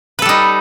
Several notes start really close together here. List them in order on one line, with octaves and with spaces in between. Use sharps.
B4 A4 G3 D#4